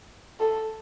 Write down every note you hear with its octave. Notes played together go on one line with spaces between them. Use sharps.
A4